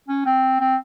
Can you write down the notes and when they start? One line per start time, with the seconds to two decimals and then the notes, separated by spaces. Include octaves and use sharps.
0.08 C#4
0.26 C4
0.60 C4